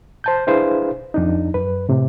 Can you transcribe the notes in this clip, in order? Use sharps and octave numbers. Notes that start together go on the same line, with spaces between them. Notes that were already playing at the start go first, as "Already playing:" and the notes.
C5 A5 G6
D4 E4 G#4 B4 C5 F5
F2 D4 D#4
F#2 B4
A2 C3